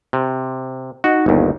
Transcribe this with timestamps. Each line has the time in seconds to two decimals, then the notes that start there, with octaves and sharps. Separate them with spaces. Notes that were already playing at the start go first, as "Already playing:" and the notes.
0.13 C3
1.04 D#4 F#4
1.26 G1 D#2